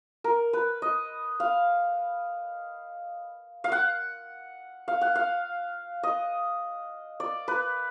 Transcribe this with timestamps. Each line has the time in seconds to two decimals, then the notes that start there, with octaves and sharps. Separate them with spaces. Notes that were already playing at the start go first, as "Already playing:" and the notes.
0.24 A#4
0.53 B4
0.82 D#5
1.40 F5
3.64 F5
3.72 F#5
4.88 F5
5.01 F#5
5.15 F5
6.03 D#5
7.20 D5
7.48 B4